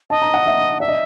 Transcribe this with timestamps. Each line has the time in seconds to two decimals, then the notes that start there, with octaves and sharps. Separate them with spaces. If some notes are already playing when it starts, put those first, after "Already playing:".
0.10 D#5 A5
0.22 A#5
0.34 F#5
0.46 E5
0.80 D5 E5
0.88 D#5